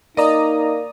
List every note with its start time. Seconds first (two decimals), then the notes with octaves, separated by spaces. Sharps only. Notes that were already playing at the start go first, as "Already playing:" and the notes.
0.17 A#3 D#4 D5 D#5 A#5 D#6